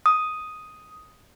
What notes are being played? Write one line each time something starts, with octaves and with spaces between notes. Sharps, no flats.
D#6